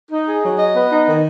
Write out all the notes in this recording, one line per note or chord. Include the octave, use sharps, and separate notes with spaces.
D#4
G#4
F#3
D#5
B3
D#4
D#3